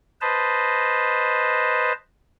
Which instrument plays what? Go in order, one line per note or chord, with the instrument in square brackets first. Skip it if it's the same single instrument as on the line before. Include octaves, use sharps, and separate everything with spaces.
[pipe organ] B4 C5 D#5 A5